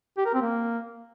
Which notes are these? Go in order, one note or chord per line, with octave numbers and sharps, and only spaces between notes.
G4
A#4
C4
A#3